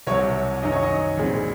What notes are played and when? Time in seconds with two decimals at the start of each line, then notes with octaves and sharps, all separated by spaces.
0.07 C2 C3 F#3 C#5
0.62 F#2 D#3 F#3 D#5
0.72 C#5
0.82 D#5
1.17 A#1 A#2 G#3 C4